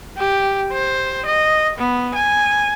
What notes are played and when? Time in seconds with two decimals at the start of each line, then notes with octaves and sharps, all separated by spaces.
0.17 G4
0.73 C5
1.26 D#5
1.78 B3
2.15 G#5